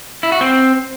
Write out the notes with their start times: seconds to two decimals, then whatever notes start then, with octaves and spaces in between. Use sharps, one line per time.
0.23 E4
0.32 F#4
0.41 C4